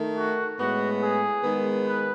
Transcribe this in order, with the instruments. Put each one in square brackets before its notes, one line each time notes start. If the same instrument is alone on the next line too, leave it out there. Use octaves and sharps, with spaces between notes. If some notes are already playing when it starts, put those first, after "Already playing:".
Already playing: [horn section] D#3 A3
F#4
A2 G#3 B3 F#4
G#4
D#3 G#3 B3
B4